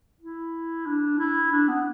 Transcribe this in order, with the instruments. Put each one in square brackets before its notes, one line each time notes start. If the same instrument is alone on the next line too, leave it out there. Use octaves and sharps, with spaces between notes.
[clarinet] E4
D4
E4
D4
B3